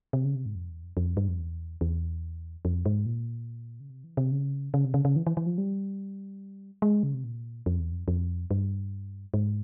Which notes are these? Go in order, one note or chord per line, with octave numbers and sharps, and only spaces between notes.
C3
C#3
C3
G#2
F2
E2
F2
F2
G2
F2
E2
E2
F2
G#2
A#2
C#3
C3
E3
C3
C#3
C#3
C3
C#3
C#3
E3
E3
E3
F3
G3
G#3
C#3
C3
A#2
F2
E2
F2
F2
G2
G#2